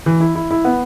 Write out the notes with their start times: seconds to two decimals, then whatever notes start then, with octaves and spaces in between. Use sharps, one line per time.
0.06 E3
0.20 E4
0.35 E4
0.51 E4
0.65 B3